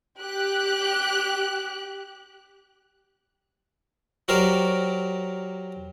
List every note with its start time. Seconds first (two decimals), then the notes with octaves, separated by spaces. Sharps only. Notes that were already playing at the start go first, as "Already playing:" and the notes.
0.20 G4 F#6
4.28 F#3 F#4 G4 A#4 C5 D5